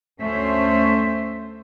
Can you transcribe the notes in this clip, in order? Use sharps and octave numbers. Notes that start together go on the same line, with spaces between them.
D2 A3 C#4 C5 E5